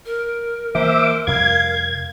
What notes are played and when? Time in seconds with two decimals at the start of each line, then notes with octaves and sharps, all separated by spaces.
0.06 A#4
0.75 E3 A#3 C5 E5 D6
1.27 F2 C3 G3 F5 G#6